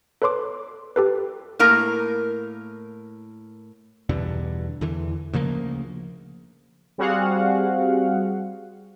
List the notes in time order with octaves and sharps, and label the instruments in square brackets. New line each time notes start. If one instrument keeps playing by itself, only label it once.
[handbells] A4 B4 C#5 C6 D6
G4 A4 B4
[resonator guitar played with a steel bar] A2 A#3 A#4 A#5
[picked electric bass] E2 G2 B2 D3
E2 D3 E3
D2 C#3 F3 A#3
[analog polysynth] G3 C4 F#4 G#4 F5 F#5